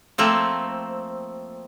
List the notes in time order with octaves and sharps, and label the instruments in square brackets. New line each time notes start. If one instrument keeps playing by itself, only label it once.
[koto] F3 A3 A#3 C4